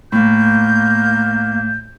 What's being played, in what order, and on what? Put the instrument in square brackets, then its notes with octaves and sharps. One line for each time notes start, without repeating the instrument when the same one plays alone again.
[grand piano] A2 [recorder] A#3 [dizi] G6